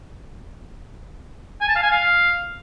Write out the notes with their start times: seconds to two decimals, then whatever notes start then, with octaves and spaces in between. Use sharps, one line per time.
1.61 G#5
1.68 A5
1.76 F5
1.83 G#5
1.90 F5